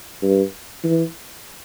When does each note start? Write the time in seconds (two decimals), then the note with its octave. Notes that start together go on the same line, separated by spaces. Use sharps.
0.22 G2
0.84 E3